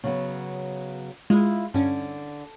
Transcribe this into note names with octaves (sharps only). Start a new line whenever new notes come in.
C#3 F#3 B3
G#3 E4 F4
G2 D3 C#4